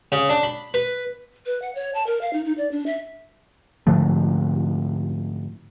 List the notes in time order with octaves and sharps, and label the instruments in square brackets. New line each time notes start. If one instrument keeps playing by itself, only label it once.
[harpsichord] C#3
D4
B5
B4
[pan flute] B4
F#5
C#5
A5
A#4
F5
D#4
D#4
D5
D4
E5
[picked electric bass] G#2 D3 F3 A3